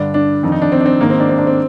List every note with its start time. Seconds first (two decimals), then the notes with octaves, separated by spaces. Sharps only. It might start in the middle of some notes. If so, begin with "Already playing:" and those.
Already playing: G2 D3 D4
0.14 D4
0.43 F2 D#3
0.52 D#4
0.62 D4
0.72 C4
0.81 D4
0.86 C4
1.01 G#2 D#3 A#3
1.10 C4
1.20 D4
1.29 C4
1.38 D4
1.47 C4